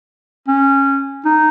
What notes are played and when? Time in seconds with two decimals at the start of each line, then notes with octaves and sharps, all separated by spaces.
0.48 C#4
1.26 D#4